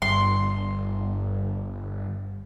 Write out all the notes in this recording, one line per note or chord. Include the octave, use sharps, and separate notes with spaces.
G1 G2 C6